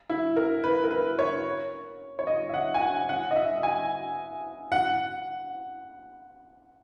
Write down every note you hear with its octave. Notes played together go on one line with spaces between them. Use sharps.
E4
A#4
B4
A#4
B4
C#5
C#5
D#5
E5
F#5
G#5
F#5
F#5
D#5
E5
G#5
F#5